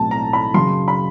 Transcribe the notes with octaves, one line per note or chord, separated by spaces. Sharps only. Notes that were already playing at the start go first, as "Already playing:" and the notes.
Already playing: B1 A2 A3 C4 A5
A#5
B5
F#2 C#3 F#3 C6
B5